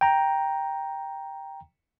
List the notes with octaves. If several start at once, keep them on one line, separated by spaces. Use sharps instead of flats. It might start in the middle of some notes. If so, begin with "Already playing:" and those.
G5 A#5